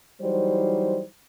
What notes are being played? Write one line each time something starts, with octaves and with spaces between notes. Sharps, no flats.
E3 F#3 G3 D#4 C5